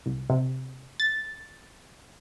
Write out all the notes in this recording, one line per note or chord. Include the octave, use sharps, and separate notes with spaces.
C2
C3
A6